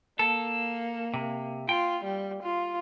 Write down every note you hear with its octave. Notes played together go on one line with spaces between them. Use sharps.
A#3 A4
C3
F4 G5
G3
F4